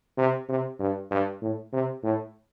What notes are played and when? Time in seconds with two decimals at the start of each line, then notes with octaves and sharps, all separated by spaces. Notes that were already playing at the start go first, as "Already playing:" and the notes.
0.18 C3
0.49 C3
0.80 G2
1.11 G2
1.42 A2
1.73 C3
2.04 A2